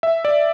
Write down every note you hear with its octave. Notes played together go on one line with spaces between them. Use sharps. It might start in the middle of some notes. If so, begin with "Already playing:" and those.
E5
D5